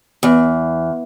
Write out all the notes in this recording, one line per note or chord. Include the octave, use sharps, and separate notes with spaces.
E2